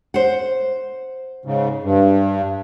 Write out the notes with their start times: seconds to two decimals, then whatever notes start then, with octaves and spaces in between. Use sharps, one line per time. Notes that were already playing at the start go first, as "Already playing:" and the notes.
0.14 C5 F#5
1.45 G#2 C#3
1.83 G2